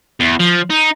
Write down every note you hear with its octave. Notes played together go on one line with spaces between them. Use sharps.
E2
F3
D#4